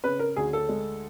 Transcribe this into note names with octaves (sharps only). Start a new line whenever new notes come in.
C#3 B4
A#4
D2 G#4
A4
G#3